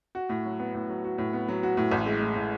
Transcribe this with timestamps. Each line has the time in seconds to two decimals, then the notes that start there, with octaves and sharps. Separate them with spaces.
0.15 F#4
0.29 A2
0.45 F#3
0.60 B3
0.74 A2
0.90 F#3
1.04 F#4
1.18 A2
1.33 B3
1.48 F#3
1.63 F#4
1.77 A2
1.91 A1
2.06 G#3
2.21 A2
2.36 A2